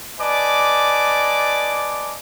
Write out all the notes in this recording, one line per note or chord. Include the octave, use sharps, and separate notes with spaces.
B4 D5 D#5 G#5 A5 D6